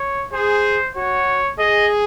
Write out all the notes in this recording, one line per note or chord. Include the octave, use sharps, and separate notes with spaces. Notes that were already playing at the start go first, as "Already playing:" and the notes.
Already playing: C#5
G#4 C5
F#4 C#5
G#4 D#5